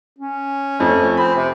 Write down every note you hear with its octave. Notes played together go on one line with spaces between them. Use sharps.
C#4
F2 A3
C4 B5
C3